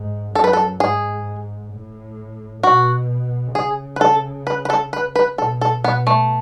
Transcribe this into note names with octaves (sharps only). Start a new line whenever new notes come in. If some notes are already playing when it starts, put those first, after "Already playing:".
Already playing: G#2
F#2 A4
B4
A4
G#2 G#4
A2
B2 F#4
C#3 G#4
B4
A4
B4
B4
A4
B4
B4
B2 A4
A4
B2 B3
A3